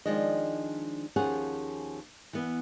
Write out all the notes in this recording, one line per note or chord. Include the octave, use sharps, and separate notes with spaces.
D#3 F3 G#3 D4 D#5
D#2 F3 C#4 G#4 F#5
E3 B3